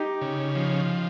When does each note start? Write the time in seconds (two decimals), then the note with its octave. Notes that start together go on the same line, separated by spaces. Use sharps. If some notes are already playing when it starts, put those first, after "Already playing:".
Already playing: D#4 G4
0.21 C#3
0.55 F3